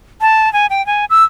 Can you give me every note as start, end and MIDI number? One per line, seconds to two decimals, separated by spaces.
0.21 0.52 81
0.53 0.67 80
0.70 0.85 79
0.87 1.05 80
1.10 1.24 88